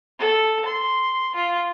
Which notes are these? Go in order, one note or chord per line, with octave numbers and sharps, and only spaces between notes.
A4
C6
F4